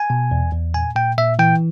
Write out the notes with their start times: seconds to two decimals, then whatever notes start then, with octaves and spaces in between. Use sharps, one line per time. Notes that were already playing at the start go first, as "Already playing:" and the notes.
Already playing: G#5
0.10 B2
0.31 E2
0.52 E2
0.74 A#2 G#5
0.96 A#2 G5
1.17 A#2 E5
1.39 E3 G5